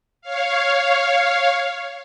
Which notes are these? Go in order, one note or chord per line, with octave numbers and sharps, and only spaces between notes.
C#5 F5